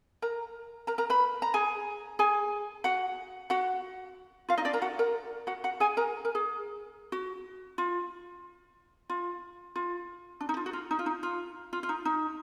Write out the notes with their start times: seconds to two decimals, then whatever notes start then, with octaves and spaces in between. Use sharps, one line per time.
0.22 A#4 A#5
0.87 A#4 A#5
0.98 A#4 A#5
1.10 B4 B5
1.42 A#5
1.54 G#4 G#5
2.19 G#4 G#5
2.84 F#4 F#5
3.50 F#4 F#5
4.49 F4 F5
4.57 D#4 D#5
4.65 D4 D5
4.73 A#4 A#5
4.82 F#4 F#5
4.99 A#4 A#5
5.47 F#4 F#5
5.64 F#4 F#5
5.80 G#4 G#5
5.97 A#4 A#5
6.25 A#4
6.35 G#4
7.12 F#4
7.78 F4
9.09 F4
9.76 F4
10.41 D4
10.49 D#4
10.57 F4
10.66 F#4
10.73 F4
10.91 D#4
10.99 F4
11.06 D#4
11.23 F4
11.73 F4
11.83 F4
11.89 D#4
12.05 D#4